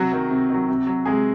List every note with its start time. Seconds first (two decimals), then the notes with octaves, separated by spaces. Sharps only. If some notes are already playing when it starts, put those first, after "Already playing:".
Already playing: C3 F#3 F#4
0.12 D#3 F#3
0.31 C3
0.49 D#3 F#3
0.69 C3
0.87 F#3
1.05 C3 G#3 G#4